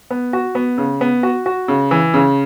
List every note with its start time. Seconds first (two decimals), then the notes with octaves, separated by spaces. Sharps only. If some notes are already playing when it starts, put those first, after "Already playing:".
0.10 B3
0.33 F#4
0.55 B3
0.78 C#3
1.01 B3
1.23 F#4
1.46 F#4
1.68 C#3
1.91 E3
2.14 C#3